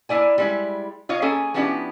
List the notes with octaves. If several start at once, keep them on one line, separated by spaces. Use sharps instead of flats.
A#3 C#4 E4 D5 G#5
G3 G#3 E4
F4 C#5 D#5 F5
A#3 C#4 G#4 A4 G#5
F3 B3 C#4 D4 E4 G4